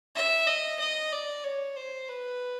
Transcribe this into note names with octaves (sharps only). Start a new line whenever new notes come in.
E5
D#5
D#5
D5
C#5
C5
B4